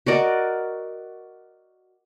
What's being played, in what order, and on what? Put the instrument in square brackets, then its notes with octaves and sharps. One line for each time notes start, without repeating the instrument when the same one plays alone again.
[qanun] F#4 A#4 D5 D#5